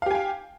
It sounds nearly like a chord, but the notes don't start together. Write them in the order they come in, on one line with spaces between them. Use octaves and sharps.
F5 G4 G#5 G5